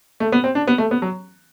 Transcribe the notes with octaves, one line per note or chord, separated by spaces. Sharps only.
A3
B3
C4
D4
B3
A3
B3
F#3